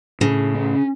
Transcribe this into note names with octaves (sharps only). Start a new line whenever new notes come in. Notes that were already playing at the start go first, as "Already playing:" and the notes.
A2 C#3
C#4